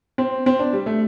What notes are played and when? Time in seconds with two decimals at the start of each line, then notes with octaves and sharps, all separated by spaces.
0.18 C4
0.46 C4
0.59 D4
0.73 G3
0.86 A3